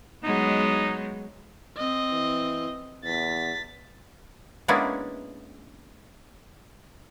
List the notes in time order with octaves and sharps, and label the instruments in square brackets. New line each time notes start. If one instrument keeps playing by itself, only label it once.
[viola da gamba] F#3 G#3 B3 [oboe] D#4
[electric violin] C4 D#5
[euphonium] E3
[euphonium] E2 [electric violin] A6 B6
[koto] G#3 A#3 B3 C#4 D4 E4